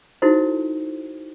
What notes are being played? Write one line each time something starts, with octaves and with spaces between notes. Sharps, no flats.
D#4 E4 F#4 A4 C5